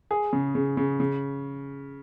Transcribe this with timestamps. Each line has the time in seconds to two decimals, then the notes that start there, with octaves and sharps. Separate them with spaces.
0.11 G#4
0.33 C#3
0.55 C#3
0.77 C#3
1.00 C#3